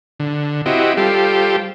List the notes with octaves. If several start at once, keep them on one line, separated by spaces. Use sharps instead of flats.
D3
C4 E4 F#4 G4 D#5
G3 F4 G4 A4 C5